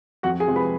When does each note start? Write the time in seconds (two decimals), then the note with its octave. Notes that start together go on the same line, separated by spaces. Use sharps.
0.23 F2 F#4 F#5
0.40 G#4 G#5
0.48 C3 F3 G#3
0.56 B4 B5